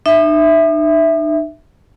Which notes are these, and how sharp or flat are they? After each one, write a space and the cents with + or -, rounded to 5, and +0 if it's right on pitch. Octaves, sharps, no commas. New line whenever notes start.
D#4 -45 E5 +0